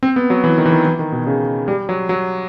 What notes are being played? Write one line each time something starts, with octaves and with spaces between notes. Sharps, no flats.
C4
B3
F#3
E3
D#3
E3
D#3
E3
D#3
B2
C#3
G3
F#3
F#3